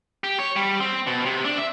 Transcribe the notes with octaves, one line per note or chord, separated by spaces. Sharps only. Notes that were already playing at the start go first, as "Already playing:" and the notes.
G4
C#5
G3
C4
B2
C3
D4
E5